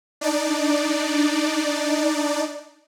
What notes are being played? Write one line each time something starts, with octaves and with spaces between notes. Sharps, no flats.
D4 D#4 D5